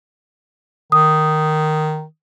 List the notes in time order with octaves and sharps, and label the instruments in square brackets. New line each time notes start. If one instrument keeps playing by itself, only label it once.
[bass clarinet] D#3 [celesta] D#6